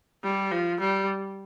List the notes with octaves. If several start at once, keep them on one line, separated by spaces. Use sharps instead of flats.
G3
F3
G3